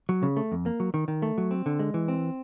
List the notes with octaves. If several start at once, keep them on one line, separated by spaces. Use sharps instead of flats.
F#3
C#3
A3
F2
A#3
F#3
D#3
D#3
A3
F#3
C4
D3
G#3
E3
C4